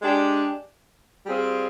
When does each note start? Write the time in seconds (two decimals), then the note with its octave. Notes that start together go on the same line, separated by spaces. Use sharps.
0.01 G#3 D4 G4
1.26 G3 C4 F4 G#4